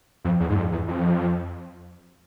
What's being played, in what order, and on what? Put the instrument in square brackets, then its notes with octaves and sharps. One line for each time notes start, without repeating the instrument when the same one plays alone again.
[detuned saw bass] F2
E2
G#2
F2
E2
F2